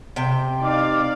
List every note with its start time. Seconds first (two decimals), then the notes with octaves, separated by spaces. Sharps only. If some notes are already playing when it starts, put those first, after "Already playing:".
0.16 C3 G5
0.62 D#4 D5 F5 D6